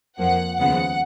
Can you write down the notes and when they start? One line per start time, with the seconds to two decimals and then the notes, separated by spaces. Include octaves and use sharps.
0.18 F2 F3 A#3 F#5
0.58 D#2 C#3 F3 G#3 B3 F#5